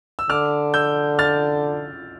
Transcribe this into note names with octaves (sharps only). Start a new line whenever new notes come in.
E6
D3 D6 F6
E6 G6
F6 A6